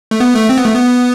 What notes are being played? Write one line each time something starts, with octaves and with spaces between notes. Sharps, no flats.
A3
B3
A3
C4
B3
A3
B3